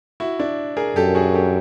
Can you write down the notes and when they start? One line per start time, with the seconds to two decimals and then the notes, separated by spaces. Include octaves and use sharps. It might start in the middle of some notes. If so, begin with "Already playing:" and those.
0.20 E4 F#4
0.39 D4 E4
0.77 G#4 A#4
0.96 F#2 G4 A4
1.15 F#4 G#4
1.34 G4 A4